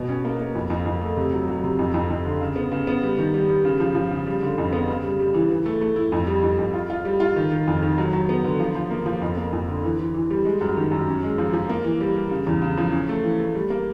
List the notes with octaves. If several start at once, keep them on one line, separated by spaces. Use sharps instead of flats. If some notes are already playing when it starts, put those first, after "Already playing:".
Already playing: B2
C#4
A#3
A#3
F2
F2
F2
A3
C3
F#3
F#3
C3
F2
F2
F2
D3
C#3
B3
C#3
B3
G3
D#3
G3
G3
C#3
F3
F3
C#3
G3
D3
F2
B3
C#3
G3
G3
E3
E3
A3
A3
E4
F2
G3
F2
F2
F4
F4
G3
F4
D#3
D#3
F2
D#3
F#3
F#3
B3
D3
F3
F3
A#3
F3
F2
A#3
F2
D3
E3
E3
E3
G3
G#3
F#2
D#3
F#2
C#4
G#3
F3
F3
A#3
E3
G3
G3
C#3
E2
C#3
F3
C#4
A3
E3
A3
G3
A#3